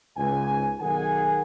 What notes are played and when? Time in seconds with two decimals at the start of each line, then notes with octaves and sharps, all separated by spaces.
0.17 C#2 G#2 G#5
0.80 B1 D#3 G#4 F#5 G#5